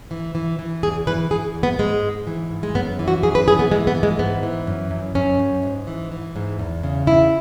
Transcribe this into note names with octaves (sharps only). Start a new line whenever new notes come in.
E3
E3
E3
E2 G#4
E3 B4
E3 G#4
E2
B3
G#2 G#3
G#2
E3
G#2
G#3
F#2 B3
E3
F#4
F#2 G#4
B4
E3 G#4
B3
E3 G#3
B3
E3
G#3
G#2 B3
E3
F#2
F#2
F#2 C#4
F#2
G#2
E3
E3
G#2
E2
C#3
E2 E4